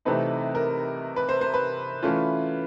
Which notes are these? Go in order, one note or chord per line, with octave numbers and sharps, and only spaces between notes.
C3 E3 A3 C4 D#4 B4
A#4
B4
C5
C5
B4
E3 A3 C#4 F4